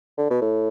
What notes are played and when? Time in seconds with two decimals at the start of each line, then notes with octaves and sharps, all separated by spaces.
0.18 D3
0.30 B2
0.42 A2